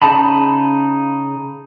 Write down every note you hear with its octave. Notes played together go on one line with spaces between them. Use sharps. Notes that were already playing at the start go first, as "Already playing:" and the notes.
C#3 D#4 A5 B5